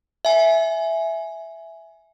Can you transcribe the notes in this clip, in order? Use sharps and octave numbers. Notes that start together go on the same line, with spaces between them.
E5 G#5